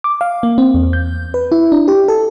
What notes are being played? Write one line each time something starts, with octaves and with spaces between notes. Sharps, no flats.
D6
F5
A#3
C4
E2
G6
B4
E4
D4
G4
A4